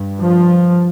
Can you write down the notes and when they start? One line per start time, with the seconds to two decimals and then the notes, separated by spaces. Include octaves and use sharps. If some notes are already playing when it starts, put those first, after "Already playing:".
Already playing: G2
0.20 F3